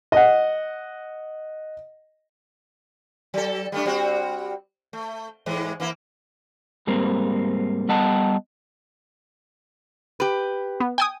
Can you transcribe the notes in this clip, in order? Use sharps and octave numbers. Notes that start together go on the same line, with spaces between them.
D#5 F#5
F#3 A4
G3 A3 D4
G3 C4 F#4
A3
G#2 E3 G#3
E3 A#3 E4
G#2 G3 A#3 C4
G3 B3 D#5 F#5 A5
G4 B4
B3
G5 G#5 D#6